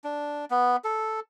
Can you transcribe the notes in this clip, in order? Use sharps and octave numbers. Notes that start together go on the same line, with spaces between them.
D4
B3
A4